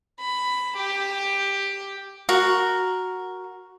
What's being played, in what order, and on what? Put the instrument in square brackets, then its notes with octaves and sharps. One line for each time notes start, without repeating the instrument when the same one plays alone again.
[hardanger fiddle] B5
G4
[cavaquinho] F#4 A#4